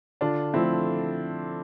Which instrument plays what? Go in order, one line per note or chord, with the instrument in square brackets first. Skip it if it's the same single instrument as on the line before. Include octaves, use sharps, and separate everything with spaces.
[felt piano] D3 [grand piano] D4 F4
[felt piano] F3 A3 [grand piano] C4 E4